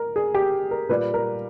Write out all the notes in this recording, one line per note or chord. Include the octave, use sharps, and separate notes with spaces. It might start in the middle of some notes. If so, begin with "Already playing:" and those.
Already playing: A#4
G#4
G4
A#4
A#2 G3 B4
A#4